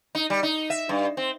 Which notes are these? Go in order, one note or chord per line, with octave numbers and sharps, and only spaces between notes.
D#4
G3
D#4
E5
G2
C4